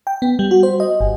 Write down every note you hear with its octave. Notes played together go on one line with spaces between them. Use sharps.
G5
B3
G3
F#4
C5
D#5
G1